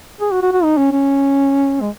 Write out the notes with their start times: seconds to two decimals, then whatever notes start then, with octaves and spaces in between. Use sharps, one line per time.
0.21 G#4
0.31 F#4
0.42 F#4
0.53 F#4
0.64 D#4
0.78 C#4
0.92 C#4
1.81 G#3